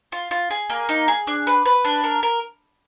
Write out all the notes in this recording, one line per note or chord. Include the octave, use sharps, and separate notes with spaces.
F4
F4
G#4
A#3
D#4
G#4
D4
B4
B4
D4
A#4
A#4